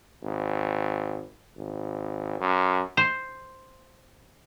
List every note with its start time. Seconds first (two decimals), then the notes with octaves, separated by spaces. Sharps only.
0.23 G#1
1.57 G#1
2.40 F#2
2.97 C5